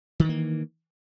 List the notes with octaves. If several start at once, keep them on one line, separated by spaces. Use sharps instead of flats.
D#3 E3 A#3